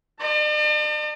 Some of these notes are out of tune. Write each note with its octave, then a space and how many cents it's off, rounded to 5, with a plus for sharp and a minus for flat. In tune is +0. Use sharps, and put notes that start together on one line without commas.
D5 +45 A5 +40